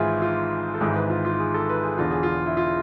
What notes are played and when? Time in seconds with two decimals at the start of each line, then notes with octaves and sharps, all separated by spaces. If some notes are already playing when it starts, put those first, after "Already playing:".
Already playing: G#1 G#2 E3 E4 F4 G#4
0.22 F4
0.74 A4
0.80 G#1 G#2 E3 G#4
0.95 B4
1.10 F4
1.25 F4
1.39 G#4
1.54 A4
1.69 B4
1.84 G#4
1.98 E1 E2 D3 F4
2.11 G#4
2.23 F4
2.46 E4
2.57 F4